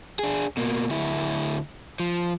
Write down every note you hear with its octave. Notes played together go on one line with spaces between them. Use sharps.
D4 G#4
B2 A#3
D2 E4
F3